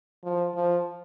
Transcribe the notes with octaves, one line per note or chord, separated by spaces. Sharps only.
F3
F3